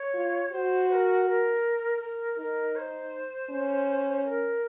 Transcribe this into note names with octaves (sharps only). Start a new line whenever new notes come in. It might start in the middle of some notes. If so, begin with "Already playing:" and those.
Already playing: C#5
F4
F#4 C5
C5
A#4
A#4
A#4
D#4 A#4
C#5
C5
C#4
A#4